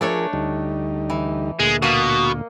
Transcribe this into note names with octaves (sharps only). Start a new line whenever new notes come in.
F3 A3 D4 G#4 A#4 C#5
D2 G3 D#4
E3
D2 A#2 G#3
B2 A#3 D#5 F#5